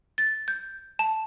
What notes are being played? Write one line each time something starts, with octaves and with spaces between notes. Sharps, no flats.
A6
G6
A5